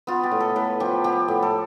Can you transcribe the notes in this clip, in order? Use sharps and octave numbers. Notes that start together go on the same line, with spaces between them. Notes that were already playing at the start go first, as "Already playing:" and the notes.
B3 F4
G4
A2
A4
A2 B4
F3 G4
B3 G4
A2
A4